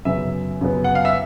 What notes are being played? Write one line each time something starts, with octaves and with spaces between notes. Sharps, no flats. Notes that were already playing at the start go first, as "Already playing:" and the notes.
F#2 C#3 F#3 B3 E5
F#2 C#3 F#3 B3
F#5
F5
E5